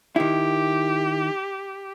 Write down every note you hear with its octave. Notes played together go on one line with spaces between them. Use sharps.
D#3 E4 G4